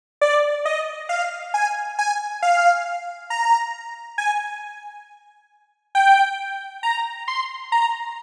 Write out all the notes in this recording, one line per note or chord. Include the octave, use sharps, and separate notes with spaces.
D5
D#5
F5
G#5
G#5
F5
A#5
G#5
G5
A#5
C6
A#5